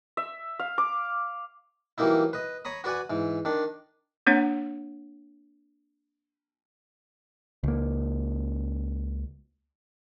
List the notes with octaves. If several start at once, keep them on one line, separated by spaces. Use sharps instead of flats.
E5
F5
D6
E3 F#3 G3 A#3 D#4 E4
B4 D#5
C#5 A#5 B5 D#6
F#4 B4 D5 F#5 G#5
G#2 E3
D#3 D4
A#3 C4 D4 C#5 F#5
C#2 A#3